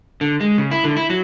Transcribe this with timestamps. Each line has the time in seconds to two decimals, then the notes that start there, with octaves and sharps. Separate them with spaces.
0.21 D3
0.41 G#3
0.58 C#3
0.71 E4
0.84 D3
0.97 E4
1.10 F#3